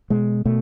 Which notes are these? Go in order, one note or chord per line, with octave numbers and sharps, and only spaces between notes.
B2 G#3
B2 A3